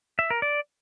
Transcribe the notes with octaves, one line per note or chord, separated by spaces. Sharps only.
E5
A#4
D5